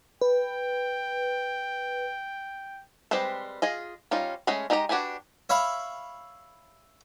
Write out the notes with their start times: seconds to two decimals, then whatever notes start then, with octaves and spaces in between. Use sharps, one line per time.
0.21 B4 G5
3.11 G3 G#3 C4 B4 C5
3.62 F4 G#4 D#5
4.11 G3 C#4 D#4 F4
4.47 G#3 A3 C#4 G#4 B5
4.70 G#3 D#4 G4 D#5 A#5
4.89 D4 F#4 G4 B4 G#5
5.49 C#5 E5 F5 B5